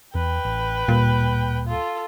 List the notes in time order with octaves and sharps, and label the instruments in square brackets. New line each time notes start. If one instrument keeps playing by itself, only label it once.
[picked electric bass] E2 [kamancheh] B4 G5
[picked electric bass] A1
[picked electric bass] D1 G3 A#3 [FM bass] A#2
[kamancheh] F4 A4